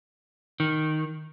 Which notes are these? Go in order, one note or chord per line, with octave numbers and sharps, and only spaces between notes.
D#3